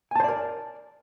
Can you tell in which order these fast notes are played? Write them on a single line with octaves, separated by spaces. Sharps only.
G#5 A5 C5 D5 A#4